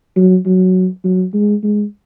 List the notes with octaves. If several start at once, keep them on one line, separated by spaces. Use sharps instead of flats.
F#3
F#3
F#3
G#3
G#3